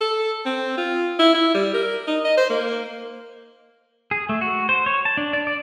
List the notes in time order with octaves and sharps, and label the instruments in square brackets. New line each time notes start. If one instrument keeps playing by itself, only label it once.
[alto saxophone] A4
C4
F4
E4
E4
G3
A#4
D#4
D#5
C5
A#3
[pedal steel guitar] G#4
A3
F#4
C5
C#5
A5
D4
D5
D5